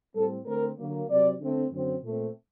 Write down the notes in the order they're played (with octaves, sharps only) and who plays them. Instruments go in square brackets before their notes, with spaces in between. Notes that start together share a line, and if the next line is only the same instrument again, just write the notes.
[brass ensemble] A2 G3 C4 A4
D3 A3 C4 A#4
D3 F#3 A#3
C3 F#3 C4 D5
D3 A3 C4
F#2 D3 F#3 C4
A#2 A3 C4